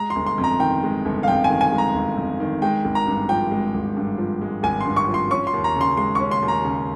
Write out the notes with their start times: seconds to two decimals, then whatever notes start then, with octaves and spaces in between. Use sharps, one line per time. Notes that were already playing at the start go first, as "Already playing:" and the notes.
Already playing: G#3 A#5
0.10 C6
0.16 G1
0.26 C6
0.38 F2
0.44 A#5
0.60 D#3 G5
0.83 G#3
1.05 G1
1.23 F5
1.28 F2 G5
1.44 G#5
1.50 D#3
1.61 G#5
1.72 G#3
1.78 A#5
1.94 G1
2.17 F2
2.40 D#3
2.62 G#3 G5
2.85 G#1
2.95 A#5
3.07 G2
3.29 F3 G5
3.51 G#3
3.74 G#1
3.96 G2
4.18 F3
4.41 G#3
4.63 G#1 G#5
4.81 G2 C6
4.96 C#6
5.08 F3
5.14 C6
5.30 C#4 C#6
5.47 C6
5.53 D#2
5.64 A#5
5.76 C#3 C6
5.97 G#3 C6
6.15 C#4 C#6
6.31 C6
6.42 D#2
6.48 A#5
6.64 C#3